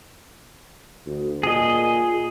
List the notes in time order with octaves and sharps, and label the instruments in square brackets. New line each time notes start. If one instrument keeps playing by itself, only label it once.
[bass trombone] D2
[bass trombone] A#2 [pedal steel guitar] G#4 D#5